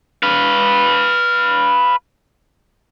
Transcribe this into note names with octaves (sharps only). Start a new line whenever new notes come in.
B4 F5